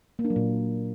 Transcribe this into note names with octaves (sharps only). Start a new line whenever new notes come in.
A#3
D4
F#3
A#2